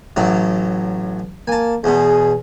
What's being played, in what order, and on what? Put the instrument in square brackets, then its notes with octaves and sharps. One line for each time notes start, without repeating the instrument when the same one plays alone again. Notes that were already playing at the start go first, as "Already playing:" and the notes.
[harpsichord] A1 A2 F#3
[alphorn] A#3 [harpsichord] G#5 A5
[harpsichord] E2 B2 [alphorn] G#4